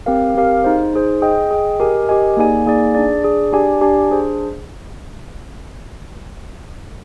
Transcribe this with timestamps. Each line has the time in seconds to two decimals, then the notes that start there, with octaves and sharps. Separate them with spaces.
0.06 C4 G4 A#4 F5
0.35 C4 G4 A#4 F5
0.64 D#4 G#4 C5
0.94 D#4 G#4 C5
1.22 G#4 D#5 G5
1.51 G#4 D#5 G5
1.80 G4 A#4 D#5 G#5
2.09 G4 A#4 D#5 G#5
2.37 A#3 D#4 G#4 D5 G#5
2.66 A#3 D#4 G#4 D5 G#5
2.95 D4 G#4 D5
3.23 D4 G#4 D5
3.52 D4 G4 D5 G#5
3.81 D4 G4 D5 G#5
4.10 D4 G#4 C5